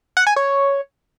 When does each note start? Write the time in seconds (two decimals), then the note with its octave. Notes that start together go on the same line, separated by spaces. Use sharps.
0.17 F#5
0.27 G#5
0.36 C#5